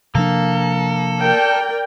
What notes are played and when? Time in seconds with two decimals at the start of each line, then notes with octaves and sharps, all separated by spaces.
0.15 C3 F3 A#3 D4 A4
1.19 A#4 D5 G5